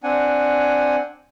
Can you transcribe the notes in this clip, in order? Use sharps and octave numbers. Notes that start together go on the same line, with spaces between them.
C4 D4 F#5 G#5